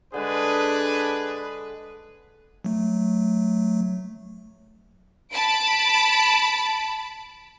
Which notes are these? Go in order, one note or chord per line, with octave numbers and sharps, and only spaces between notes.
D3 G#3 D4 G#4 B4
F#3 A3
A5 B5 D7